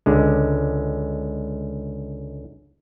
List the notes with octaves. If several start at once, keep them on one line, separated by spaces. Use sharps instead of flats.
C#2 D3 G#3